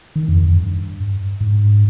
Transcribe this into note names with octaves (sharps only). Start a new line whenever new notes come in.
D#3
F2
F2
G2
G#2